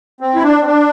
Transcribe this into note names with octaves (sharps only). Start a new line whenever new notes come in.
C4
E4
D4
C4
D4